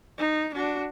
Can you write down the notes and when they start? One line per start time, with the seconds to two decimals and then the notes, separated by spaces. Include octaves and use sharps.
0.18 D#4
0.55 D4 F#4